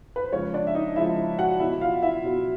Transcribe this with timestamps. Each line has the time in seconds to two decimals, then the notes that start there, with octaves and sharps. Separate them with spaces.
0.16 B4
0.24 C5
0.33 C#3 F3 G#3 C#4 C#5
0.54 D4 D5
0.67 E5
0.75 D#4 D#5
0.96 C#3 F3 G#3 E4 E5
1.39 F#4 F#5
1.60 B2 F#3 E4 E5
1.81 F4 F5
2.03 E4 E5
2.24 B2 F#3